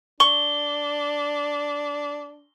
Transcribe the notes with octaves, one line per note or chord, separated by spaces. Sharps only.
D4 C#6 G7